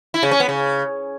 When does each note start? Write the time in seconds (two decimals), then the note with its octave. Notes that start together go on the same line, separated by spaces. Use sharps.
0.14 E4
0.23 C#3
0.31 C#4
0.40 B3
0.49 C#3